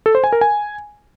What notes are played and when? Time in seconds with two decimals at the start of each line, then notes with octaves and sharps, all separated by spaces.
0.06 A4
0.15 C5
0.24 G#5
0.32 A#4
0.41 G#5